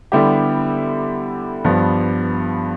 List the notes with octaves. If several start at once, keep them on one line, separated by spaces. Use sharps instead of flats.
D3 G3 B3 E4 G4
G2 F3 B3